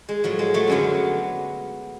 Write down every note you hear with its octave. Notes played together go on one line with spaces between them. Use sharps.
G#3
A2 F3 F#3
G#3
F#3 A3
F#2 D3 F#3 G#3 B3